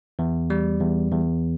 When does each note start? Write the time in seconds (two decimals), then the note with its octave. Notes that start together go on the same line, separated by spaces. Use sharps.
0.19 E2
0.50 G3
0.81 E2
1.11 E2